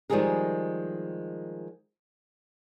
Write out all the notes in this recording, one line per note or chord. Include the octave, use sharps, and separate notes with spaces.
D#3 F3 G3 G#3 G#4 A#4